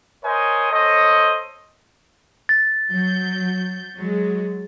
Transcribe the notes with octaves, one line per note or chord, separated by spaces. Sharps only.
A#4 C5 C#5 D#5 G#5
A4 C5 C#5 D#5
A6
F#3 G6
F#3 G#3